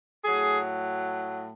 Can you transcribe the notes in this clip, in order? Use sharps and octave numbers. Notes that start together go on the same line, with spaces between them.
A2 F#3 G#4